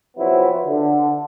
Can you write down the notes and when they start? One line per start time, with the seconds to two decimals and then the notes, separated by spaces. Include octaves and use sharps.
0.17 C3 F3 F#3 B3 C4 E4
0.65 D3